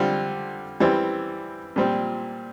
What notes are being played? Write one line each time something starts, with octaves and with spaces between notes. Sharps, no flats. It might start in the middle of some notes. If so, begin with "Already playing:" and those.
Already playing: D3 G3 C4 F4
E3 G3 C4
A#2 G3 C4